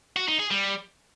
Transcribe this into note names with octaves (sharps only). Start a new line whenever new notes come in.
F#4
D#4
G#4
G3